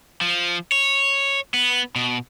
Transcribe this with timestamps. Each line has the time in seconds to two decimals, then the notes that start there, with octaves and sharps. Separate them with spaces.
0.21 F3
0.72 C#5
1.54 B3
1.96 B2